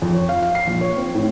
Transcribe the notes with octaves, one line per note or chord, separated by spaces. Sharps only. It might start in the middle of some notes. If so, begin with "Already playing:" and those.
F2
C#5
F5
F5
C7
A#1
C#5
C4
A2